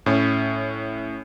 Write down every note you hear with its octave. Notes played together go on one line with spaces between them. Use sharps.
A2 C#4